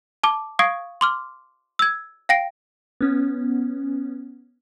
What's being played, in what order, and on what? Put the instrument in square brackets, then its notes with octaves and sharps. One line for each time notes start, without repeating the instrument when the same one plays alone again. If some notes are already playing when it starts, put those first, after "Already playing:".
[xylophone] A5 D6
F5 C#6 D#6 G#6 C7 D7
C6 D6 F6
E6 G#6
F5 G5 A#6 C7 D7
[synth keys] B3 C#4